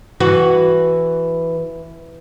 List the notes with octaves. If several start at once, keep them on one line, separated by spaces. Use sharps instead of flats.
E3 F#4